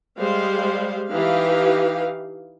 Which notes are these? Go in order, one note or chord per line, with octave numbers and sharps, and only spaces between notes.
G3 G#3 C5 F5
E3 D#4 G4 F5